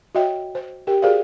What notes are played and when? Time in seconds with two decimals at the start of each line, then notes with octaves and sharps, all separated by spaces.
0.15 F#4 C#5 D#5 E5 G5
0.55 C5
0.87 G4 A#4 G5
1.02 F#4 G#4 A#4 C5 D5 F5